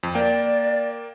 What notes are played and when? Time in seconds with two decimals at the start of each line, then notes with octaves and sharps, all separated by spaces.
0.03 F2
0.15 A#3 D5 G5